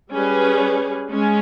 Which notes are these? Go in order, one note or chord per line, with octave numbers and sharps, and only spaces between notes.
G3 C#4 G#4 B4
G#3 C#4